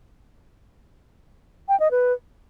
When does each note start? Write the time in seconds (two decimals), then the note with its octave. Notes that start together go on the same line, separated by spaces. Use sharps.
1.69 G5
1.80 D#5
1.91 B4